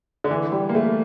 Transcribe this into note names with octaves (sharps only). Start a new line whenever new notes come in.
D3
E3
G3
A#3
A3